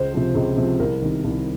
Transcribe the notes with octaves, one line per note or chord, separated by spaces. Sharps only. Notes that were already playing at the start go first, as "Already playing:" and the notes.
Already playing: C#2 C5
C3 F3
C#2
C3 F3
C2 A#4
C3 D#3
C2